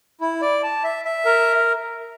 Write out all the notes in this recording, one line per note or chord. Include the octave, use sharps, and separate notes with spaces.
E4
D5
A5
E5
E5
A#4